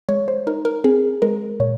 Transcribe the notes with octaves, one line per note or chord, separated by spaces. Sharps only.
G#3 C#5
C5
D#4 A#4
A#4
C4 G#4
G#3 A#4
A#2 C#5